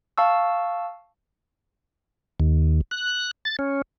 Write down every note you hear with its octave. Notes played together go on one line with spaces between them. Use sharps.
F5 A5 C#6 E6
D#2
F#6
A6
C#4